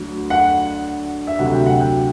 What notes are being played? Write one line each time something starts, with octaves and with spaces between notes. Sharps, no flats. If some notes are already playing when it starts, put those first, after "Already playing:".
Already playing: D2 D3 F#3
F#5
E5
D2 C3 F#3 F#5
G5
F#5
G5